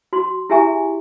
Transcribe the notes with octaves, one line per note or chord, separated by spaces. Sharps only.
F#4 C6
E4 G4 G#4 E5 G#5 C#6